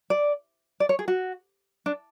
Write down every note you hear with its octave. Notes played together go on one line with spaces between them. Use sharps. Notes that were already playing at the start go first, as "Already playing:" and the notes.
D5
D5
C#5
G#4
F#4
D4